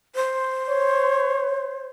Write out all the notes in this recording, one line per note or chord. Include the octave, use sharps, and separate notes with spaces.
C5
C#5